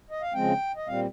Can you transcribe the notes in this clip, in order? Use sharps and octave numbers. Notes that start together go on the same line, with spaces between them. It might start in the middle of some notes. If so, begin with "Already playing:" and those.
D#5
F5
C#3 F3 G#3 C4 G5
D#5
A#2 G3 C4 F5